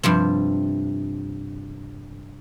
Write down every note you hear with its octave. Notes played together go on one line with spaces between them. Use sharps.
G2 C3 F3 C4